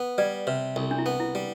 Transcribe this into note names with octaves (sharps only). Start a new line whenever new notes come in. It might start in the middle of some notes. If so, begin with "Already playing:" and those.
Already playing: B3
G3 B4 D5
C3 B4
C2 A4
D4
E4
B3
E4
G3